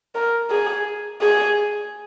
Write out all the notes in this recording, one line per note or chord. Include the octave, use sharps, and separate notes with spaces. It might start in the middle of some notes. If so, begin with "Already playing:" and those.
A#4
G#4
G#4